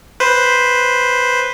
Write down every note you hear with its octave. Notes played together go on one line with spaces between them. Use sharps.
B4 C5